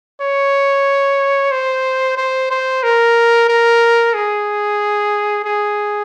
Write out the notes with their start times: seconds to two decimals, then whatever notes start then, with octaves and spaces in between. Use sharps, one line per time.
0.22 C#5
1.52 C5
2.17 C5
2.51 C5
2.83 A#4
3.49 A#4
4.14 G#4
5.45 G#4